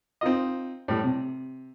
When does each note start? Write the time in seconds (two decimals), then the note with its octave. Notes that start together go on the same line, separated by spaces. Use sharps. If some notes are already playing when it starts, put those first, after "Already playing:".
0.21 C4 D#4 F4 D#5
0.88 A2 G3
1.04 C3